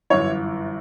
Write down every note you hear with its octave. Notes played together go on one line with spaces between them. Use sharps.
G1 F#2 E3 C#5